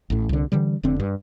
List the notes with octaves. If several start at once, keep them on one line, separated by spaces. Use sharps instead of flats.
A1 A2
C2 D3
D3 E3 G3
F1 D3 C4
G2